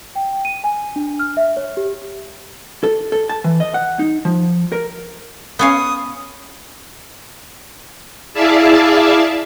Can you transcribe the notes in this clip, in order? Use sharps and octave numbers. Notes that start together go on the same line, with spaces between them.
G5
D#7
G#5
D4
F6
E5
C#5
G4
A4
A4
A5
E3
D#5
F#5
D#4
F3
A#4
B3 C#4 F5 D#6
E4 G#4 D5 E5 F5 A5